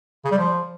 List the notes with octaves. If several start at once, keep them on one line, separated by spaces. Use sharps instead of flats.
C#3
G3
F3